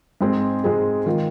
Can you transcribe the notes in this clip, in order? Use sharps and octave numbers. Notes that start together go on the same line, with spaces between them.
G#2 G#3 C4 G#4
G#2 G#3 C4 G#4
D#3 G#3 F4